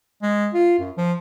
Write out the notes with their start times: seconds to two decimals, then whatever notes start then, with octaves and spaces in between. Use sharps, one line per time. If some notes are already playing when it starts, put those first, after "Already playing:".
0.22 G#3
0.54 F4
0.79 F#2
0.97 F3